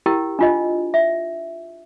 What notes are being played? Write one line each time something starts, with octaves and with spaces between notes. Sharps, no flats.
E4 G4 A#4 G5
D4 F4 D#5
E5